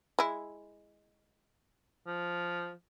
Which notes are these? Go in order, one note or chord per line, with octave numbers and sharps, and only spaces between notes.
G#3 E4
F3